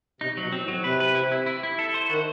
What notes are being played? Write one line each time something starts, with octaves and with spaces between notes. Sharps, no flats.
C3 D#4
F#3
B2
C4
A2
F#3
C3 B4
B4
E4
E4
E4
E4
A4
C5
D#3 F#4